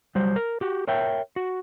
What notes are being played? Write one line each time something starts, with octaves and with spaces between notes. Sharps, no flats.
F#3 G3 C5
A#4
F#4 G4
A#4 C#5 E5 G5
F#4